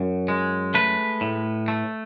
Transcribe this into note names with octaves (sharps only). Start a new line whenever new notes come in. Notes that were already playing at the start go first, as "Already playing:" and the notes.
Already playing: F#2
G#3
A3 B4
A2
A3